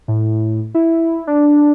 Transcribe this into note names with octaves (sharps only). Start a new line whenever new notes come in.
A2
E4
D4